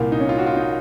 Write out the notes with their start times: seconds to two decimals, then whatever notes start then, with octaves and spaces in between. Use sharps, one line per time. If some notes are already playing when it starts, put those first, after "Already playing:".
Already playing: C2 A#2 A#3
0.12 D#4
0.20 C#4
0.29 F4
0.38 F#4
0.47 F4
0.56 D#4